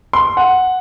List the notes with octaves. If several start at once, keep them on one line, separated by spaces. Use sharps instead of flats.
C6
F#5